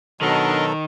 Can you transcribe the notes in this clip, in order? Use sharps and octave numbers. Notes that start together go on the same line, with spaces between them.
B2 D#3 F#3 D4 A4 A#4 D#5